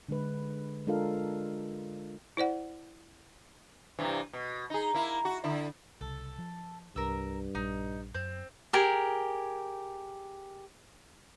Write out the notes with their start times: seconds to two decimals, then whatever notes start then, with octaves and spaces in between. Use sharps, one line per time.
0.09 D3 G#3 B4
0.87 G#3 D4 F4 A4 A#4 F5
2.37 E4 C5 D5 F#5
3.99 G2 C3 E3
4.33 B2
4.70 D#4 G#4
4.94 A#3 E4
5.25 F#4
5.44 D3 E4
6.01 C2 C#3 A4
6.38 F3
6.96 C2 G2 A#4 E6
7.55 A#1 G3 D#4
8.15 F#2 C4
8.73 G4 G#4 A#4 G#5